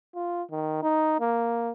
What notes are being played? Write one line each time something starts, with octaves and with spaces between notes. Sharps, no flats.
F4
D#3
D#4
A#3